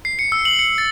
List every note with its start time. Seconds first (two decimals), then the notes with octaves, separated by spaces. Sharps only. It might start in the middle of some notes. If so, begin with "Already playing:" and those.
0.05 C7
0.19 C#7
0.32 E6
0.45 F#7
0.59 C#7
0.78 A6